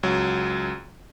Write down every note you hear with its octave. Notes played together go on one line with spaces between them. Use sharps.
C#2 F#3